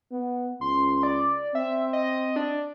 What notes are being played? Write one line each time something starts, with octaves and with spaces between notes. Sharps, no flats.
B3
C#2 C6
D5
C4 E5
D#5
D4